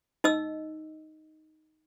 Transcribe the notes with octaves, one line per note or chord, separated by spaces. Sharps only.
D#4 D#5 E6